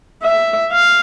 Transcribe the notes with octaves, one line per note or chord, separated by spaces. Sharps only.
E5
F5